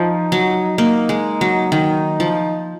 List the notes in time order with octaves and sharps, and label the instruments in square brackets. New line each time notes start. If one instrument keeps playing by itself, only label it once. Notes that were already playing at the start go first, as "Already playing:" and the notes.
Already playing: [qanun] F3 [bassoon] D#4
[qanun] F#3
[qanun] A#3 [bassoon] D#4
[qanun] G#3
F#3
[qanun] D#3 [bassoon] D#4
[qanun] F3